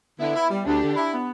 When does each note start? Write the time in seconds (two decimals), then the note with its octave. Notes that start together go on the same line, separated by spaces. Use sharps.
0.19 D3 B3 E4
0.35 E4
0.50 G3
0.65 D2 D4 G4
0.82 D3
0.96 E4
1.12 B3